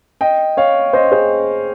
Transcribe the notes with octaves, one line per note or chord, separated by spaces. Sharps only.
D#5 G5
C#5 F5
C5 D#5
G#4 C5